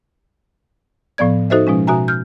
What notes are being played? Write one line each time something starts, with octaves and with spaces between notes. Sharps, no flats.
A2 F3 B3 D5 G#6
D#4 F#4 A4 C5 D#5 E5
B2 F3 G#3 C#4
B2 F#4 E5 G#5 A#5
F6 G6